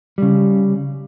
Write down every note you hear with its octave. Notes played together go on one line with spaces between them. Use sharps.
C#3 G3